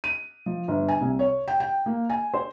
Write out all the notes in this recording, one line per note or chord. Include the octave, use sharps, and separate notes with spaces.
D#7
F3
G1
G#5
C2
C#5
G5
G5
A#3
G#5
C5